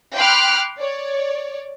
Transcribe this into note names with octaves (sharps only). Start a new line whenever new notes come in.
G5 B5 C6 D6 F6 F#6
C#5 D5